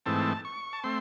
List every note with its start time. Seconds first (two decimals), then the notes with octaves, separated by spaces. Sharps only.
0.06 G#2 E3 A3 C4 A5
0.45 C#6
0.73 A5
0.84 A3 C4 C6